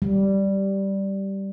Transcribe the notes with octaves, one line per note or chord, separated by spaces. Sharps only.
G3